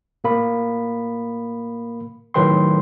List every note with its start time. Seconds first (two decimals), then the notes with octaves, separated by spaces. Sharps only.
0.24 A2 A#3 B5
2.34 A2 D#3 F#3 B4 G5 C6